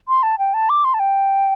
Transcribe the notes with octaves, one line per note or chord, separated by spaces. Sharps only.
C6
A5
G5
A5
D6
C6
A5
G5